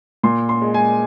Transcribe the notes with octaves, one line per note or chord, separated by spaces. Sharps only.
A#2 C6
C6
G#3
G#5